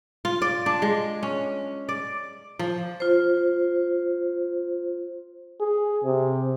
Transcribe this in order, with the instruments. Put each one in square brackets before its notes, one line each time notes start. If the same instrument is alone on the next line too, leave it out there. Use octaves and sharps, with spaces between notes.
[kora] F4
D5
D4
G#3
C#4
D5
F3
[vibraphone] F4 C5
[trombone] G#4
C3